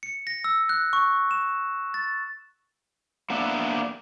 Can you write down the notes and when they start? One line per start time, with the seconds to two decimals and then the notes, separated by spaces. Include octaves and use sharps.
0.03 C#7
0.27 A#6
0.44 E6
0.69 F#6
0.93 C#6
1.31 E7
1.94 A6
3.30 A#3 B3 D4 D5 E5